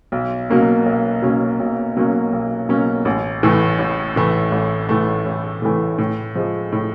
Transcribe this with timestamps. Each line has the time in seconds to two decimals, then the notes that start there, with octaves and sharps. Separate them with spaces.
0.12 B1
0.50 B2 F#3 A#3 C#4
0.86 B1
1.22 B2 F#3 A#3 C#4
1.60 B1
1.96 B2 F#3 A#3 C#4
2.33 B1
2.69 B2 F#3 A#3 C#4
3.05 A1
3.43 A2 E3 A3
3.79 A1
4.16 A2 E3 A3
4.52 A1
4.89 A2 E3 A3
5.26 A1
5.62 A2 E3 A3
5.98 A2
6.35 F3 G#3
6.72 A2